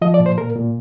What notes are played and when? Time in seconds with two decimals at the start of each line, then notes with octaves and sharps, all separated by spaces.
0.02 F3 D#5
0.14 D5
0.20 A#2
0.26 C5
0.38 A#2 A#4
0.56 A#2